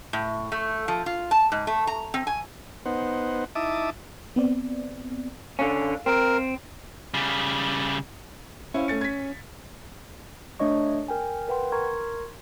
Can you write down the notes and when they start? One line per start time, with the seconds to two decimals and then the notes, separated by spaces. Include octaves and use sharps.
0.13 A2
0.52 A3
0.88 F3
1.06 F4
1.31 A5
1.52 G#2
1.67 A3
1.87 A#5
2.14 C4
2.27 G#5
2.86 B3 D#4 C5 F#5
3.55 D#4 E4 E5 A5 D6 D#6
4.36 B3 C4 D5
5.59 D3 C#4 F5
6.06 C4 A#4
7.14 C#3 G3
8.74 C#4 E4 C5 F5
8.88 A3 A6 C#7
9.01 G#6 B6
10.60 A3 D4 C#5 D#5 C#6
11.08 A#4 G5 G#5
11.48 A#4 B4 F#5 G5 C6
11.72 A#4 A#5 C6 C#6 G#6